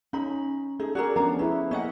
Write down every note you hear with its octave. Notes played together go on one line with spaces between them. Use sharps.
C#4 D#4 B5
D#4 G#4 A4
F#4 G#4 A#4 D5
F3 B3 C#4 D4 A#5
C#4 E4 G#4 B4
A#3 B3 C#4 D#5 F#5